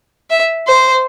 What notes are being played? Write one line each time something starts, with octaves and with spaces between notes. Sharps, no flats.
E5
C5